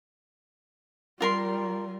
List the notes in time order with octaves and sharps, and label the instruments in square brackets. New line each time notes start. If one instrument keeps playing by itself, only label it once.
[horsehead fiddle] G3 [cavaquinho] F4 A#4 C6